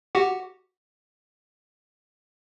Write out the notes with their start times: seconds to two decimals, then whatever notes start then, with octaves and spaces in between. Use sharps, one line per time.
0.15 F#4 G4 F#5